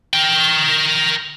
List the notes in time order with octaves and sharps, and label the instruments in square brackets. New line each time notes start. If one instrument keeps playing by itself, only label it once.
[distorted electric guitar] A#4 G5